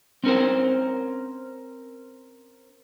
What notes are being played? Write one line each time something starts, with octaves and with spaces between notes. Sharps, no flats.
C4 C#4 A#4 C5